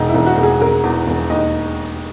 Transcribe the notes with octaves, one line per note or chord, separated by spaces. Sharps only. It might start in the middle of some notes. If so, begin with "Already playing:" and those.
Already playing: E1 D#4
E4
E1
F#4
E1
G#4
E1 A#4
E2
E1
D#2 D#5